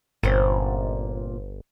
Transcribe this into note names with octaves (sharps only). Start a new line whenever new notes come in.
G1 A#2 C4 C#4